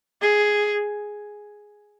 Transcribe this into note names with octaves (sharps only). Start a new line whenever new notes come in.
G#4